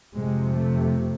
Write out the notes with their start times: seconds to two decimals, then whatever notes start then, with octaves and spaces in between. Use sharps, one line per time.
0.15 F2 C3 G#3
0.54 A3